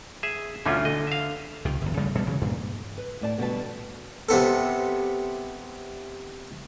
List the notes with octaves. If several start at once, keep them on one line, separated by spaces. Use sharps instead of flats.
G#4 E5
D2 D3 C#4 F4
D3 D#5
E5 F5
C#2 C3 D#3
G1 E2
C#3 G3 A3
B2 G3
C#3 E3 F#3
G2 A#2
B4
A2 D5 A5
B2 D3 G3 B4 A5
C3 B3 A4